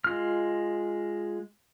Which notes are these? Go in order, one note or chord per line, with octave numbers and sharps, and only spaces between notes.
G#3 F4 F6